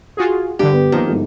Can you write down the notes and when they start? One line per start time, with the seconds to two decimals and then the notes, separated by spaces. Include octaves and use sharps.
0.17 F4 F#4 G#4
0.59 G2 D3 G4
0.73 B3
0.92 D#3 F3 A#3
1.08 G1 G#2